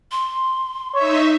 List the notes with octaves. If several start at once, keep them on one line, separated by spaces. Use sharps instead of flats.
C6
D#4 C#5 E5